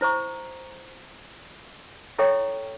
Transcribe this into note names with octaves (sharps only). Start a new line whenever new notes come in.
E4 C5 A#5 C#6
E4 A4 C#5 E5 G5 C#6